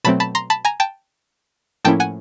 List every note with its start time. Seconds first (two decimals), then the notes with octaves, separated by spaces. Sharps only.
0.04 B2 F#3 A3 C4 A5 B5
0.20 A5 B5
0.35 A#5 C6
0.50 A5 B5
0.65 G#5 A#5
0.80 G5 A5
1.84 A2 F3 A#3 C#4 E4 G5 A5
2.00 F#5 G#5